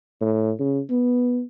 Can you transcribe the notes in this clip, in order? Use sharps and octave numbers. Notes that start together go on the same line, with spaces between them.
A2
C#3
B3